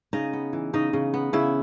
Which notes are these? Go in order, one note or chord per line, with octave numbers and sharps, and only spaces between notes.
C#3 D#4 D#5
B3
E3
C#3 D#4 D#5
C#3
B3
C#3 E4 E5